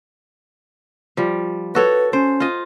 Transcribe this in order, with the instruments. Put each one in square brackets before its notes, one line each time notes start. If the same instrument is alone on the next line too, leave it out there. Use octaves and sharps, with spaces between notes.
[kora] F3 G3
[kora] F#4 A4 C#5 [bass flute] B4
[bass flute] C#4 [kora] C5
[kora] F4 D#5